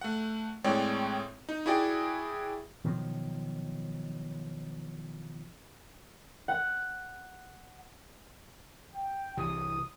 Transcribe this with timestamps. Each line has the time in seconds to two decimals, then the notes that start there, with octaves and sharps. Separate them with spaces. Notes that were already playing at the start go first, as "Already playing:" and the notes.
0.01 A3 F#5
0.64 A2 G#3 C4 C#5 D5 G5
1.49 D#4
1.66 E4 F#4 G#4 D5 G5
2.84 B2 D#3 F3 F#3
6.48 F#5
8.95 G5
9.37 C2 C3 E3 D#6